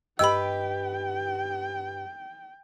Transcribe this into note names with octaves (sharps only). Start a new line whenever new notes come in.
G2 G4 B4 D#5 G5 B5 E6